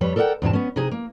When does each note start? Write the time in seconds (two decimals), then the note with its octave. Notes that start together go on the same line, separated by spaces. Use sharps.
0.01 F2 G3 B4 C#5
0.16 A4 A#4 D5 D#5 F#5 G5
0.42 E2 G#2 C3 A5
0.53 B3 C#4
0.76 C3 D#4 G#4
0.91 A#3